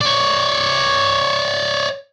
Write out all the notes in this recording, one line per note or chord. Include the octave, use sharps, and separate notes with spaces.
C#5 D5